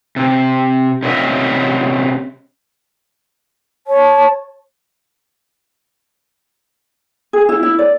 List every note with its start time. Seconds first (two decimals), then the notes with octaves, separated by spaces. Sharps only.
0.16 C3
1.03 C3 C#4 F4 D#5 E5
3.87 C#5 A5
7.33 G#4
7.49 E4
7.63 E4
7.79 D5